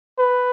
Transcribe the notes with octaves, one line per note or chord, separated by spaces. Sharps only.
B4